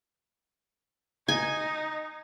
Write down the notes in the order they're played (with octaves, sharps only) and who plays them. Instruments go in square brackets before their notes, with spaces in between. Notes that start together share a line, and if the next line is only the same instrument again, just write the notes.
[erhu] D#4 [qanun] G#5